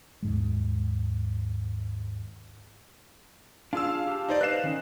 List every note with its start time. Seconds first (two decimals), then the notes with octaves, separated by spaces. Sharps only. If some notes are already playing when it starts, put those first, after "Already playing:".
0.23 D#2 G#2 G#3
3.73 D4 F4 G#4 F5 E6
4.07 G4 A5
4.29 D#4 C5 D5
4.41 B4 D#5 F5 F#6 E7
4.63 D#3 C#4 D#4